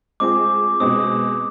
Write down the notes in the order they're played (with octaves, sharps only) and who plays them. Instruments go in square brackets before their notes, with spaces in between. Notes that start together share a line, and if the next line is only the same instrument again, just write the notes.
[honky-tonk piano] G#3 C4 F4 G#4 [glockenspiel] D6
[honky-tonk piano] B2 G#3 C4 [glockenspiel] D#6